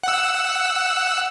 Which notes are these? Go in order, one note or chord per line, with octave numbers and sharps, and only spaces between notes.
F#5 E6